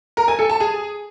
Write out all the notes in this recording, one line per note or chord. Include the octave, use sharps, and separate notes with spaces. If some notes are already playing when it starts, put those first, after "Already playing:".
A#4
G#5
A4
A5
G#4